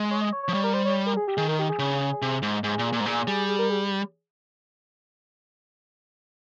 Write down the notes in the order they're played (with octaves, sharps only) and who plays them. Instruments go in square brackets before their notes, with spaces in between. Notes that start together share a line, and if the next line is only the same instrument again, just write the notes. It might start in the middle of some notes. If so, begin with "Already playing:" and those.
Already playing: [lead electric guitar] G#3
[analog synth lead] C#5
D#5
C#5
C#5
[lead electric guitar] F3
[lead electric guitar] G3 [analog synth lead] C#5
[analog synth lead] A#4
C5
C#5
A#4
G#4
G4
[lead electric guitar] D#3 [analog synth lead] G#4
[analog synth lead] A#4
G4
G#4
[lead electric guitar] C#3
C3
G#2
[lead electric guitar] G#2 [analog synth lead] G#4
[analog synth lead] G#4
[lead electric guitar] A#2
[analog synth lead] G#4
[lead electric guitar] A#2
[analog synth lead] A#4
[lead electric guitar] G#2
[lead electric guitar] A#2 [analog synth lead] G#4
[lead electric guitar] G3 [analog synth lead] G#4
[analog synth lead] G#4
A#4
G#4